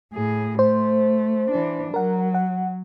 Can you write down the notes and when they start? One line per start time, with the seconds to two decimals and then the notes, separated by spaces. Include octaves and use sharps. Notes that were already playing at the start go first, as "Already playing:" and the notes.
0.13 A2 G#4
0.59 A3 C5
1.51 E3 D4
1.94 F#3 A#4 F#5
2.34 F#5